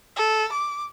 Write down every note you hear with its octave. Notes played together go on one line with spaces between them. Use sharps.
A4
D6